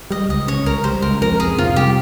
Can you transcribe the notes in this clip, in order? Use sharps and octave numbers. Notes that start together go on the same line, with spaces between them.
G3 D#5
C#2 D#5
C#3 C#5
C#2 A#4
G3 C5
C#2 A#4
F2 A#4
F1 G#4
C3 F4
G3 G4